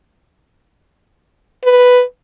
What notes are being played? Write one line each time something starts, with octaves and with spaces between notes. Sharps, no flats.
B4